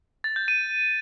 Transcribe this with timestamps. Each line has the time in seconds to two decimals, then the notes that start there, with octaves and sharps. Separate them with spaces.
0.24 A6
0.36 G6
0.48 D#7